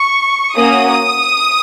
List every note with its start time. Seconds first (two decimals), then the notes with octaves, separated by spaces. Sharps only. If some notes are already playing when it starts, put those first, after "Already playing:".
Already playing: C#6
0.55 A#3 C#4 F#4 D#6